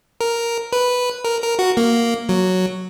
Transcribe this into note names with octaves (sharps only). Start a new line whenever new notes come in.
A#4
B4
A#4
A#4
F#4
A#3
F#3